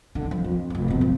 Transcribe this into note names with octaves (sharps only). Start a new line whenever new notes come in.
D3
F3
F2
F1 F3
E2 B2
F3 C4